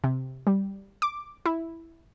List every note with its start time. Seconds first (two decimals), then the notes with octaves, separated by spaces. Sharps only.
0.04 C3
0.47 G3
1.02 D6
1.46 E4